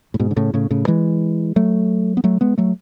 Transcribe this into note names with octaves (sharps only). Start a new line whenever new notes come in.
A2
G#2 B2
D3
A2 C#3
A2 C#3
A2 C#3
E3 G#3
F#3 A3
B3
F#3 A3
G#3 B3
F#3 A3